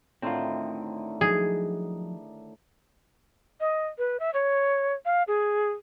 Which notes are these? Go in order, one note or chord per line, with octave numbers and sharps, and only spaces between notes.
A2 D3 D#3 C4 F4
F3 F#3 D#4 G#4
D#5
B4
E5
C#5
F5
G#4